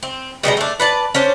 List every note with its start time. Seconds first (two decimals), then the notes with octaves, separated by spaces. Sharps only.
0.03 C4
0.43 B2 G3 G#3 A#5
0.57 A3 D4
0.80 B4 D5 A5
1.15 C#4 D4 C5